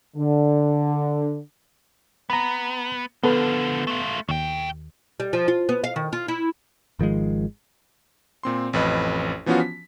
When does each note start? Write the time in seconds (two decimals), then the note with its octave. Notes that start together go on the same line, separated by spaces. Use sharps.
0.16 D3
2.30 B3 A#5 B5
3.23 D3 F3 B3 A4 B4
3.87 A3 F4
4.29 D#2 B2 G5
5.20 G3
5.33 F3
5.48 F4
5.69 B3
5.84 F5
5.96 D#3
6.13 F4
6.28 E4
6.99 G#1 D#3 F3 G#3
8.43 A#2 C4 C6
8.73 A1 F2 B4 D#5
9.46 E3 F3 B3 C#4 F4 F#4
9.60 B6